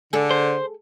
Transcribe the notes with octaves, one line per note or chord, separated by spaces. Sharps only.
D3 G#4 A4
C5